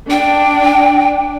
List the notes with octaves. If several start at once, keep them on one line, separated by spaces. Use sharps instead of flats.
D4 G5